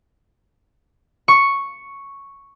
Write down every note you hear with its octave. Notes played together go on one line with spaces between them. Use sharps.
C#6